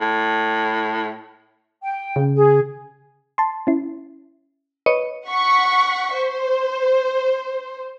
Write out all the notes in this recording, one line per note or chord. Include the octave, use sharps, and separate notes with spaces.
A2
G5
C#3
G#4
A5 C6
C#4 E4
B4 C#5 D#5 C#7 D#7
F#5 C#6 B6
C5